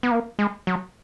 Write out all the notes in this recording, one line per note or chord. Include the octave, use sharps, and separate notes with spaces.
B3
A#3
G#3
F#3